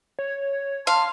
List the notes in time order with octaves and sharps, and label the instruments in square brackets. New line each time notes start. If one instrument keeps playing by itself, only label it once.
[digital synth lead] C#5
[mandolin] F5 [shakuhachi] A5 [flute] C6